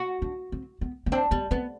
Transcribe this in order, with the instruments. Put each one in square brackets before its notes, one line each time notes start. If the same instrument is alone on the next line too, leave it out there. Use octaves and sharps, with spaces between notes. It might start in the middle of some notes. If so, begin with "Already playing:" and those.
Already playing: [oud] F#4
[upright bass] D4
C4
B3
B3
[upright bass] C4 [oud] D4
[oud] G3 [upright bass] B3
[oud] B3 [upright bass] C4